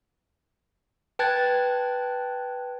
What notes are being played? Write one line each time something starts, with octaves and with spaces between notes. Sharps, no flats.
B4 G5 A5 F#6 G#6 A6